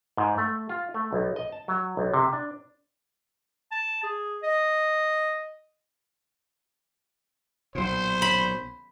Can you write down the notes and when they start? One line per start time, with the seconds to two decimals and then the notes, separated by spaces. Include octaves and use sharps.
0.17 G#2
0.38 A3
0.69 F4
0.94 A3
1.13 B1
1.36 D#5
1.52 A5
1.68 F#3
1.97 B1
2.14 C3
2.33 D4
3.72 A5
4.03 G#4
4.43 D#5
7.75 B1 A#2 C5
8.22 B5